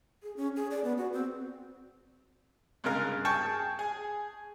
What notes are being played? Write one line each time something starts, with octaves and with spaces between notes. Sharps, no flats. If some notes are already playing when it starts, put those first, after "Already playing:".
G#4
C#4
G#4
D5
B3
F#4
C4
G2 C#3 G#3 A#4 F5
G#4 G5 A5 C#6
G#4